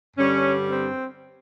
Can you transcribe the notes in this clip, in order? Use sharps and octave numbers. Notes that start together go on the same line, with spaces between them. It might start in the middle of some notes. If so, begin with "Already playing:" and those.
G2 D3 G3 C#4
C4